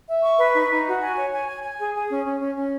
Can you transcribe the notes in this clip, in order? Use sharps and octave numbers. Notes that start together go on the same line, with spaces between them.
E5
C#6
B4
D#4
D#4
F#4
G#5
C#5
G#5
G#5
G#5
G#4
G#4
C#4
C#4
C#4
C#4